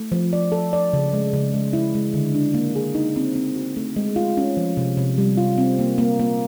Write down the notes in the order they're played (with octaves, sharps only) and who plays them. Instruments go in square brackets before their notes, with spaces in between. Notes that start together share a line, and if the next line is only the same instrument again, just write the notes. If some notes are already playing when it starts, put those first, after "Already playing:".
Already playing: [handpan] A3
F3
D5
A4
D5
C#3
G#3
C#3
G#3
E4
G#3
D3
D4
A#3
G#4
D#4
C4
C4
F#4
A3
G#3
F4
C#4
F3
C3
C3
G3
F4
C4
A#3
A#3
A#3